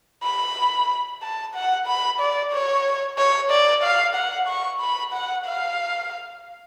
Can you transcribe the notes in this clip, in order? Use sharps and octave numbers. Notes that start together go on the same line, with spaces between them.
B5
A5
F#5
B5
D5
C#5
C#5
D5
F5
F#5
C#6
B5
F#5
F5